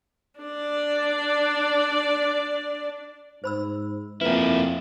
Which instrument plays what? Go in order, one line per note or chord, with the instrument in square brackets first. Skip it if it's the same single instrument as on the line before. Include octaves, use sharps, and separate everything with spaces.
[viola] D4 D5
[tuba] G#2 [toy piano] C5 B5 E6
[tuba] F2 [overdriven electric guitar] A#3 E4 [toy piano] B4 A#5